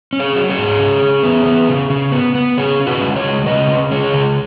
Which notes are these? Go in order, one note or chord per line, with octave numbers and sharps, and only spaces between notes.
C#4
G#4 C#5
F#3
G#4 C#5
G#2
C#3
C#3
B3
B3
C#3
C#3
B3
B3
C#3 G#4 C#5
C#4
F#4 B4
G#3
G#4 C#5
C#3
C#3 B4 D#5
C#4
G#3 G#4 C#5
C#3